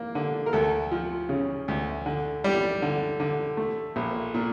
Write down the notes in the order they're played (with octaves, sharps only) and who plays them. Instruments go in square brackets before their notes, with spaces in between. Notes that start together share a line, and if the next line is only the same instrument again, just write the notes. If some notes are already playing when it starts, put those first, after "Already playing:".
Already playing: [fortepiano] A#3
D3
A#4
D2 A4
F3
C#3
D2
D3
G3
D3
D3
A3
A#1
A#2